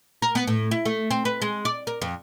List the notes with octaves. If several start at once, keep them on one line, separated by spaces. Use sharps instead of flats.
A#4
B3
A2
E4
A3
C4
B4
G#3
D5
A#4
F2